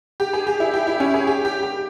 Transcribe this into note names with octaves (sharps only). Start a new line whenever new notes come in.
G4
G#4
G4
E4
G4
E4
C#4
G#4
G4
G4
G4